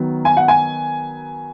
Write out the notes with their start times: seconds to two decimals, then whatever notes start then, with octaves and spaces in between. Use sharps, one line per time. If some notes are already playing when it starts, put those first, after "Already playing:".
Already playing: D#3 F#3 B3
0.25 G#5
0.37 F#5
0.48 G#5